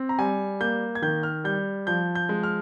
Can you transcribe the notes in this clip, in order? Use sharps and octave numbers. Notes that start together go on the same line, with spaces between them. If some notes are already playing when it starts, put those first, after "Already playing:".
Already playing: C4
A#5
G3 G#5
A#3 G6
G#6
D#3 G6
F6
G3 G6
F3 G6
G6
G#3
F6